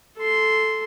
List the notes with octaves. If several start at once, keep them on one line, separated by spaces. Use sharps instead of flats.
A4 C6